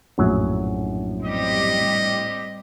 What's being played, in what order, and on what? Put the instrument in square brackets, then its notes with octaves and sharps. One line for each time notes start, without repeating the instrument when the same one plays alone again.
[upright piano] A#1 A2 [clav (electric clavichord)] F#2 F#3
[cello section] G3 C4 G4 [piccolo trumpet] D#5